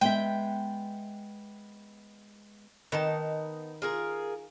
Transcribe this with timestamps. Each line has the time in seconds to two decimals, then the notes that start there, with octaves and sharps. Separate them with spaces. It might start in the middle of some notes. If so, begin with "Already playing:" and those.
0.01 G#3 B3 E5 G5
2.92 D#3 B3 D#4 A5
3.82 F4 G#4 A#4